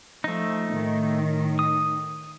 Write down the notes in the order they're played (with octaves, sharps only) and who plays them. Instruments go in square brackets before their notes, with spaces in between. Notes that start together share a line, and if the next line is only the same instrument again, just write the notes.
[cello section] F3 [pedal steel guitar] A3 D#4
[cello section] A2 D#3
[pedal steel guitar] D#6